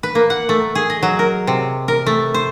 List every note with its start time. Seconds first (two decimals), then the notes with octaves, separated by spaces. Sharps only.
0.03 B4
0.15 A#3
0.30 F#5
0.49 A3
0.75 G#4
0.90 D#5
1.03 F#3
1.19 A#4
1.47 C3
1.88 A#4
2.07 A3
2.34 C5